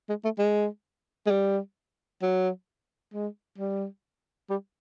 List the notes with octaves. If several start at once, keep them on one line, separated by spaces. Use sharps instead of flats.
G#3
A3
G#3
G#3
G3
F#3
G#3
G3
G3